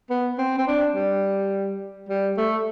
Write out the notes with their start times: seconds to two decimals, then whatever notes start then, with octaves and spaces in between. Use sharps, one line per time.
0.10 B3
0.38 C4
0.58 C4
0.67 D4
0.96 G3
2.09 G3
2.37 A3